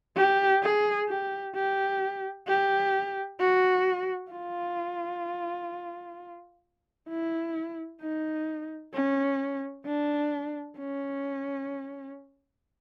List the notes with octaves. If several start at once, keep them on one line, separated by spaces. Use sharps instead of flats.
G4
G#4
G4
G4
G4
F#4
F4
E4
D#4
C#4
D4
C#4